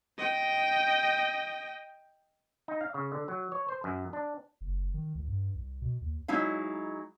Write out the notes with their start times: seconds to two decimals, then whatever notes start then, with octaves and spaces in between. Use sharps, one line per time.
0.18 D#5 G5
2.68 D#4
2.81 F5
2.94 C#3
3.12 D3
3.28 F#3
3.52 C#5
3.69 C5
3.84 F#2
4.13 D4
4.61 F#1
4.94 D#3
5.15 C#2
5.28 G2
5.55 C2
5.81 B2
6.01 D#2
6.28 F#3 G#3 D#4 E4 F5